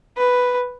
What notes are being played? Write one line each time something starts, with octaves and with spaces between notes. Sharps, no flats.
B4